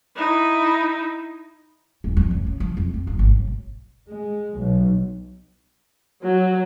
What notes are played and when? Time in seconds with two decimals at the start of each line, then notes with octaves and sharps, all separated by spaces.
0.16 D#4 E4
2.04 D#1
2.17 F2
2.31 C#2
2.47 C#3
2.60 F3
2.77 F2
2.94 C4
3.07 D1
3.19 G#1
3.37 B1
4.06 G#3
4.55 B1
6.23 F#3